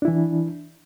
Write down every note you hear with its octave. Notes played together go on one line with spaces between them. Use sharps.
E3 D4 E4